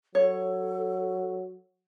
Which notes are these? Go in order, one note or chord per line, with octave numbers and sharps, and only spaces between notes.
F#3 A4 C#5